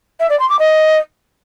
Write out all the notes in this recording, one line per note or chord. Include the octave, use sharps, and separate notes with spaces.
E5
D5
C6
D6
D#5